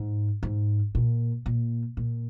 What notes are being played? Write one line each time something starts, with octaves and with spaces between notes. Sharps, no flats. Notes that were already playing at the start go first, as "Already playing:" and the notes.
Already playing: G#2
G#2
A#2
A#2
A#2